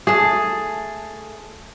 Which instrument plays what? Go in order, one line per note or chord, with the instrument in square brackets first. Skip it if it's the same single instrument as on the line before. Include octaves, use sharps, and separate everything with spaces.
[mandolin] A3 B3 A5 [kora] G#4